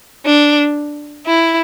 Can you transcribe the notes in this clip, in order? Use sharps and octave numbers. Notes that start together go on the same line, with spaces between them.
D4
E4